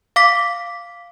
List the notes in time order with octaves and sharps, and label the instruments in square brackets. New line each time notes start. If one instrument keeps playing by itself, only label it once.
[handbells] F5 D6 B6